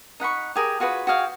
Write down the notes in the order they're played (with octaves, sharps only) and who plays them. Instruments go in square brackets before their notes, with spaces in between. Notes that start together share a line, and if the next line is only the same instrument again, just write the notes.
[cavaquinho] D#4 F#5 B5 C#6
G4 G#4 A#4
F4 F#4 G#4 B4
F#4 G#4 F5 G5